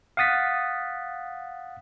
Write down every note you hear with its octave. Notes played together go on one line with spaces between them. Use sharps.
F5 F#5 D#6 A6 B6